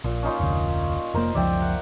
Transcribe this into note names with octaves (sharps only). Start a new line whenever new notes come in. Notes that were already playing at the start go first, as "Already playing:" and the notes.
A#1 A#2
C#4 D#4 F4
F1 D2
F1 A#3 A#4 C5
F#1 C#2 F3 D5 E5 G5
F#5